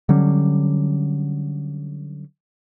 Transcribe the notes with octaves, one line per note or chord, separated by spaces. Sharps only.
D3 F#3 G3 C#4